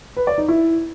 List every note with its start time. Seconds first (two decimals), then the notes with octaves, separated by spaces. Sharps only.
0.16 B4
0.27 D5
0.38 D#4
0.48 E4